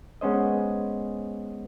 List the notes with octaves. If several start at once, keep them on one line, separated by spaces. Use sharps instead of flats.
G#3 B3 C#4 C5 D#5